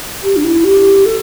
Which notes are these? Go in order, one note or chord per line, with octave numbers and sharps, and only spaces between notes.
G4
D4
E4
G4
A4